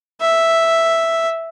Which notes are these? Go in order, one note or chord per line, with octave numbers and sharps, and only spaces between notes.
E5